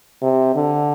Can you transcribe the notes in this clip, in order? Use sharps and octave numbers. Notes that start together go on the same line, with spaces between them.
C3
D3